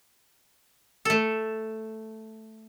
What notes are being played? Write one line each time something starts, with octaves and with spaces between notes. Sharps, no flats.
A3 A4